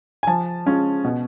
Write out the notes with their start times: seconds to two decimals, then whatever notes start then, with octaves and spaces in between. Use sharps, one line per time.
0.23 G#5
0.27 F3 A5
0.66 G#3 C#4 F4
1.04 B2